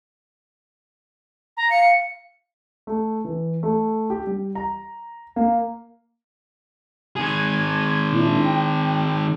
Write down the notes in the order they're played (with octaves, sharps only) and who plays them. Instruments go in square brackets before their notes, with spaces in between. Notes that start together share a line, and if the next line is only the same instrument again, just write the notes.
[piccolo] A#5
[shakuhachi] F5 [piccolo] C#7
[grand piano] A3
E3
A3
G4
G3
A#5
A#3
[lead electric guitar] D#3 G#4 [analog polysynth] G#6 D#7
[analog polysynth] A#2 D4 E4
G5